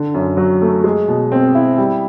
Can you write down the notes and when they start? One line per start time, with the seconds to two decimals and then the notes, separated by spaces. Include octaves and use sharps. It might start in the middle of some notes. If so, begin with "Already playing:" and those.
Already playing: D3
0.14 F#2
0.37 F#3
0.62 A3
0.84 G#3
1.08 B2
1.32 C4
1.55 E4
1.78 G3